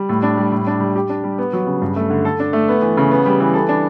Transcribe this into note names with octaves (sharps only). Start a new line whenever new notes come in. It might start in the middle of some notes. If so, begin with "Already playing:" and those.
Already playing: G3
A2
D4
G3
A2
D4
G3
G4
D4
G3
B3
F#3
C#3
G2
A3
D3
A4
D4
A3
B3
E3
C#3
B3
G3
E3
A4
D4